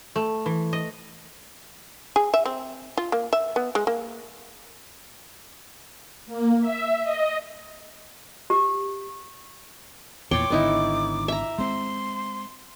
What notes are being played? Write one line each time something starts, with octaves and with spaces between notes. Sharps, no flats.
A3
E3
D#5
G#4
E5
C4
F4
A#3
E5
B3
G#3
A#3
A#3
E5
D#5
G4
E2 A#2 E3 C#5 G5 C6 D6
G#1 D3 B3 D#4 E4
E5 A#5
G#3 C4 C6